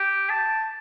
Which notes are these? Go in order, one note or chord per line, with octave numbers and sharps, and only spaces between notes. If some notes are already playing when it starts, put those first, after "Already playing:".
Already playing: G4
A5